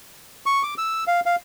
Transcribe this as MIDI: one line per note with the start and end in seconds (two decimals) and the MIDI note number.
0.46 0.63 85
0.63 0.74 86
0.78 1.04 88
1.07 1.20 77
1.26 1.36 77